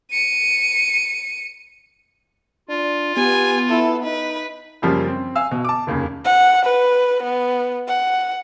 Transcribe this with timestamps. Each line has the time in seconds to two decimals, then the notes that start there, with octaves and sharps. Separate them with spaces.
0.11 C#7 D#7
2.69 D4 F4
3.17 B3 G4 G#5
3.69 E4 A4
4.03 D#4 B4
4.82 F#2 C#3 F3 G3 A#3
5.07 C4
5.36 F5 G#5 E6
5.51 B2
5.65 A5 D6
5.87 F1 D#2 C#3
6.25 F#5
6.65 B4
7.23 B3
7.88 F#5